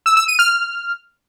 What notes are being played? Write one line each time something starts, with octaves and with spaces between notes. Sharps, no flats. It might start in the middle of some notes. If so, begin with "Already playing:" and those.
E6
E6
D#7
F6